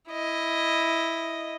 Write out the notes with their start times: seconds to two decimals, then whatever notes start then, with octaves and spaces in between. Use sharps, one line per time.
0.10 E4 D#5